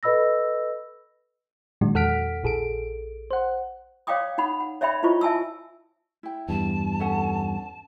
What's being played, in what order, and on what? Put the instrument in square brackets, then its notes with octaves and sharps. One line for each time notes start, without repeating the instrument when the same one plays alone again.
[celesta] A4 B4 D#5 B5 E6 A#6
[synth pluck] A#2 D#3 F#3 G#3 D4 F#4
E2 A4 F#5 F6 B6 D7
A#1 G#4 A4 D7
C5 F#5
[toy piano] C#5 D5 F5 G5 D6 D#6
D#4 F#5 B5
F#5
C#5 D5 E5 G5 B5
E4 F4 C5 D#5 C#6
E5 G#5 A5 E6
[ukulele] E4 G5
[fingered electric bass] E2 G2 [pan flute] A5
[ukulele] C#4 A4 F#5